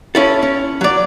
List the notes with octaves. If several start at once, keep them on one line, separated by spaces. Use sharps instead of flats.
C#4 E4 A4
C#4
F#3 D5